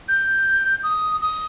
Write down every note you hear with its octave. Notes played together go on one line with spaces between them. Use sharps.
G6
D#6
D#6